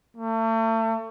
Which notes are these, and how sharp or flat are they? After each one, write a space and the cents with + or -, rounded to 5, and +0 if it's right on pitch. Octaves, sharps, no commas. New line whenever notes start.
A3 +35